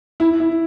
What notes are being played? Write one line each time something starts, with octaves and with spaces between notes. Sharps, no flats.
E4
E4